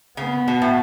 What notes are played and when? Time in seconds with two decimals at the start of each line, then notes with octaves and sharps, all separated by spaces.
0.17 C#3 B3
0.48 B2
0.62 A2